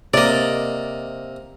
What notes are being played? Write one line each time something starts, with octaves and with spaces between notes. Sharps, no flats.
C3 A#3 D5 D#5